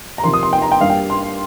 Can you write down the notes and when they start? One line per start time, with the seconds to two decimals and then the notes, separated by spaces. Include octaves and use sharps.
0.18 A#5
0.24 C3 F3 A#3 C6
0.33 D#6
0.43 C6
0.53 G5
0.62 A#5
0.72 G5
0.81 G2 G3 A#3 F5
0.90 G5
1.10 C6